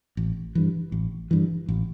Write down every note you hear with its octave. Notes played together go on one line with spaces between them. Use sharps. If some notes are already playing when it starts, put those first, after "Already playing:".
A1
G2 E3
A1
G2 E3
A1